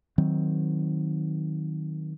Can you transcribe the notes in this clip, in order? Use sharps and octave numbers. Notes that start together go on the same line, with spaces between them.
D#3 F#3 C4